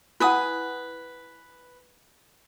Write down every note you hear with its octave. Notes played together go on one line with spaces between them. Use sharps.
E4 B4 F#5 G#5 D#6